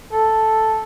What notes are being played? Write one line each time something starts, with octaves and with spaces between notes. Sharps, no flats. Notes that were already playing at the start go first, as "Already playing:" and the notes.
A4